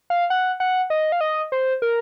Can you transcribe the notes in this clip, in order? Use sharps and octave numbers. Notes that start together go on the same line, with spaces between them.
F5
F#5
F#5
D#5
F5
D#5
C5
A#4